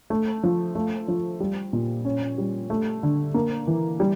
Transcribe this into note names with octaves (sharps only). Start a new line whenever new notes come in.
A3
F3
A3
F3
G3
A#2
C#4
G3
A3
D3
A#3
E3
G3